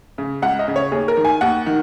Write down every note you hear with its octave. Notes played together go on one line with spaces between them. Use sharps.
C#3
C#2 F#5
D#5
C#3
C#5
D#2 G#4
A#4
D#3
G#5
D#2 F#5
D#3